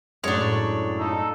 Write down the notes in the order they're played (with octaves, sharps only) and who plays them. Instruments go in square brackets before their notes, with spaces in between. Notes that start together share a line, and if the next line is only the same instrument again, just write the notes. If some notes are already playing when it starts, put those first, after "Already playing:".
[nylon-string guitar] F#2 A2 [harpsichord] G#3 A3 [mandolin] D4 C#5
[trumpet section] D#4 F4 A4